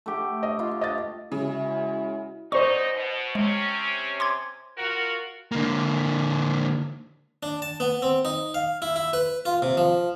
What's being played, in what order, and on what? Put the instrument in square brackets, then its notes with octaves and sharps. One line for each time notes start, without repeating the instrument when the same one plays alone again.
[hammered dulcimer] A3 G4
[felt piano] D#5
[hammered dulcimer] F4
[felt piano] D#5 A6
[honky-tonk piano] C#3 [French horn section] G#3 E4 F#4
[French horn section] F#2 D#4 D#5 [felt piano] C5 D5 [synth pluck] C#6
[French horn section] B2
[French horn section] C3 C#4 [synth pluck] G#3
[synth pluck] C6 D6 G#6
[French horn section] F4 F#4 A#4
[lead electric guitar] D3 A#3
[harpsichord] D4
A5
B3
C4
D#4
F5
E4
E4
B4
F4
C3
F3